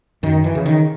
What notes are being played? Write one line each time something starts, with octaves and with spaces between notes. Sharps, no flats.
F#2 D#3
E3
C#3
D#3